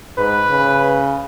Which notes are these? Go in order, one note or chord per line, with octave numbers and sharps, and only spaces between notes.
G#2 B4
C#3